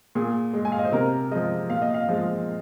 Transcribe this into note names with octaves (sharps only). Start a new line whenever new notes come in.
A#2 G#4
G#3
G#5
F5
D#5
C5
C3 A#4
F3 G#3 D#5
A#2 F5
D#5
F5
F3 G#3